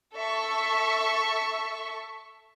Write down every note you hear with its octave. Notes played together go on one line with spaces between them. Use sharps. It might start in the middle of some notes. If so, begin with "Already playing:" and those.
A4 E5 C#6